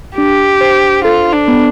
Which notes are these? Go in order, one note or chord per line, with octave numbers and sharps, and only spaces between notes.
D4 G4
C5
F4 A4
D4
B3